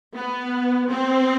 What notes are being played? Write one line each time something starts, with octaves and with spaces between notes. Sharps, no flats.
B3
C4